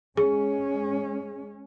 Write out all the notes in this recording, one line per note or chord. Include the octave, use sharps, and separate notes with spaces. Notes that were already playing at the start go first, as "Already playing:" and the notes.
G#3 C#4 G#4